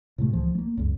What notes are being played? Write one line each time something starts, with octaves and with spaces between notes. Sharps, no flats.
A2 C3 A3
C#2 E3 F3
A3 A#3
C#2 F#2